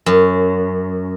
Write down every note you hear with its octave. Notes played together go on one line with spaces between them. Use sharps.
F#2